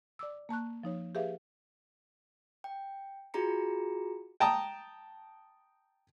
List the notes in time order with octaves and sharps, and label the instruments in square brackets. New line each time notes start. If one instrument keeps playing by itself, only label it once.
[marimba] D5 D6 E6
A#3 A5 C#6 F#6
F3 D#4 C#5
G4 G#4 B4 E5 F5
[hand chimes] G5
F4 F#4 G#4 A#5 C#7
[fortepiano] G5 A5 A#5 D#6